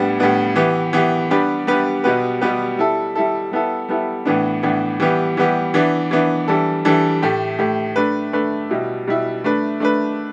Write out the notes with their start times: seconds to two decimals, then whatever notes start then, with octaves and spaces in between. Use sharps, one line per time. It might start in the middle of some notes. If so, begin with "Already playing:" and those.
Already playing: A2 G3 B3 D4
0.19 A2 G3 B3 D4
0.56 E3 B3 G4
0.93 E3 B3 G4
1.30 G3 B3 D4 G4 B4
1.67 G3 B3 D4 G4 B4
2.04 B2 G3 B3 G4 B4
2.41 B2 G3 B3 G4 B4
2.78 G3 E4 A4
3.15 G3 E4 A4
3.51 G3 B3 E4 A4
3.89 G3 B3 E4 A4
4.25 A2 E3 B3 D4
4.63 A2 E3 B3 D4
5.00 E3 G3 B3 G4
5.37 E3 G3 B3 G4
5.74 E3 B3 D4
6.11 E3 B3 D4
6.48 E3 G3 D4 A4
6.85 E3 G3 D4 A4
7.22 A2 A3 G4
7.59 A2 A3 G4
7.96 A3 D4 B4
8.33 A3 D4 B4
8.70 B2 G3 E4
9.07 B2 G3 E4
9.44 A3 D4 B4
9.80 A3 D4 B4